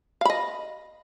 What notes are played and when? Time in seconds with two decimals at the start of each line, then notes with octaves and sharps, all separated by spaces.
0.21 F5
0.25 B5
0.30 D#5